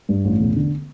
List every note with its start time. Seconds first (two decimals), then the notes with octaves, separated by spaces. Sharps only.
0.09 G2
0.25 A1
0.40 E1
0.56 D3